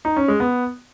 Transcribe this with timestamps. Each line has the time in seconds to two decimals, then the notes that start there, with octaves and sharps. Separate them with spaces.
0.05 D#4
0.17 C#4
0.28 G#3
0.40 B3